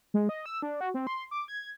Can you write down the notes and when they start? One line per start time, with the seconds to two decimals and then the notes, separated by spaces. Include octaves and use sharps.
0.14 G#3
0.29 D#5
0.46 E6
0.62 D4
0.81 F#4
0.94 C4
1.07 C6
1.31 D6
1.48 G#6